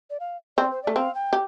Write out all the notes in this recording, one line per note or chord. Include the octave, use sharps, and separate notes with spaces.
D5
F5
C4 D5
C5
A3 D5
C4 F5
G5
G4